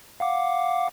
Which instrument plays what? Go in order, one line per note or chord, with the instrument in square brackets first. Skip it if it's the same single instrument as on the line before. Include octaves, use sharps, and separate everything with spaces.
[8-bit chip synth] F5 F#5 D6